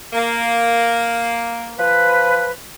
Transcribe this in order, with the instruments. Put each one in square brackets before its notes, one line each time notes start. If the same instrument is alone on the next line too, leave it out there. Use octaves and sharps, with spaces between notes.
[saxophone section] A#3
[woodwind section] F3 B4